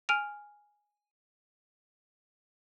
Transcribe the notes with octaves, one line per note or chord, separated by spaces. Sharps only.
G#5 F6 D7 D#7 F7